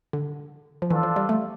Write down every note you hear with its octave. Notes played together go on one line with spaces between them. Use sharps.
D3
F3
E3 D4 F4 A4
F3
G3
A3